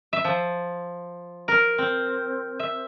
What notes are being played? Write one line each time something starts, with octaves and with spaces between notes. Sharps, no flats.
E5
F3
A#4
C4
E5